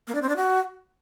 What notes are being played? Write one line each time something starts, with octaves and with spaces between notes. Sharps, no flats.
A#3
D4
C4
D4
F#4